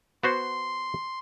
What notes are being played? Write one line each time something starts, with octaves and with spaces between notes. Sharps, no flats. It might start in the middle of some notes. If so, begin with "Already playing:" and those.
B3 F#4 C5 C6